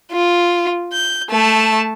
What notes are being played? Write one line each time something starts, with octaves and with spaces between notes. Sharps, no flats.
F4
G6
A3 A5